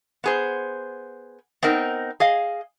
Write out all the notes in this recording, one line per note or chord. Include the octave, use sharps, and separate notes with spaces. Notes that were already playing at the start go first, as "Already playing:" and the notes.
B3 G#4 C5
B3 C4 D#4 A#4
G#4 D#5 F5